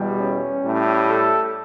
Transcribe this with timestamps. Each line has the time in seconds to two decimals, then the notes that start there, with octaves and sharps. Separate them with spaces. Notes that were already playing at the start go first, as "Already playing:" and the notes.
Already playing: E2 B2 G3
0.20 C#4
0.64 A2 G3
1.09 A4